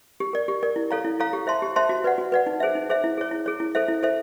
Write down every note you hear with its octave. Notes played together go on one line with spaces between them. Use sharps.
G4
A#4 D5
G4
A#4 D5
E4
A4 C#5 F5 A#5
E4
A4 C#5 F5 A#5
G4
C5 E5 A5 C6
G4
C5 E5 A5 C6
F#4
B4 D5 F#5
F#4
B4 D5 F#5
D#4
G#4 C5 E5
D#4
G#4 C5 E5
E4
G#4 C#5
E4
G#4 C#5
E4
A4 C5 E5
E4
A4 C5 E5